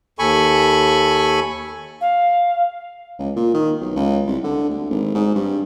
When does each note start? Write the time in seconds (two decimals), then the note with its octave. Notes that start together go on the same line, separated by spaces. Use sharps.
0.19 D#2 A4 G#5 B5 C#6
2.01 F5
3.19 C#2
3.36 A#2
3.54 D#3
3.81 B1
3.96 C#2
4.27 C2
4.44 D3
4.70 D2
4.91 G#1
5.15 G#2
5.35 G2